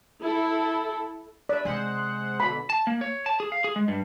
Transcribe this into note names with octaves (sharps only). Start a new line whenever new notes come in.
E4 A4
B4 D5 E5
C3 G#3 C5 F#5
B2 D3 B5
A5
A#3
C#5
A5
G#4
F5
G#4
G#3
G2